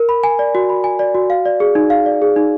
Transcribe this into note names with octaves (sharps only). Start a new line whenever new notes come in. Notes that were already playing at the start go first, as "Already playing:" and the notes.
Already playing: A#4
B5
G#5
D5
F#4
B5
G#5
D5
F#4
F5
D5
G#4
D#4
F5
D5
G#4
D#4